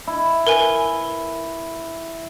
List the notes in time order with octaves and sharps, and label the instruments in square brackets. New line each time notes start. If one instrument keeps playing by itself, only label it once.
[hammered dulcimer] E4
[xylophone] A#4 B4 G#5